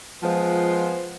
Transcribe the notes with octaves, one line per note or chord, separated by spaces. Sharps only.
F3 G#3 B3 F4 C5